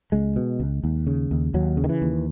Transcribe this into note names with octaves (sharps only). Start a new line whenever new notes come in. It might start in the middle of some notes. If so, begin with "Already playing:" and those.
C#2 G#3
B2
C#2
D#2
C#3
D#2
D#2 F#3
C#3
D#3
E3
D#2